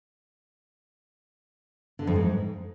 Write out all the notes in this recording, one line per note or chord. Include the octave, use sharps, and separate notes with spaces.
D3
F2
G#2